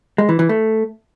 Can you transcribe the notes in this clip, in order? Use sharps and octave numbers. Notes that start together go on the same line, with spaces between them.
G#3
E3
E3
A3